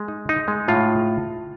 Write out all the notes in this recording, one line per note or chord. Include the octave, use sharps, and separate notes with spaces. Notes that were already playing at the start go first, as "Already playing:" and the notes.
Already playing: G#3
D#4
D#4
G#3
A2 F4